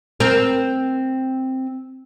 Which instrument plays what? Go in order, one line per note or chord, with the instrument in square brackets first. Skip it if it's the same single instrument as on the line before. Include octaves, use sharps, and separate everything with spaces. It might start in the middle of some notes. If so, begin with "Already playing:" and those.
[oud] C4 A#4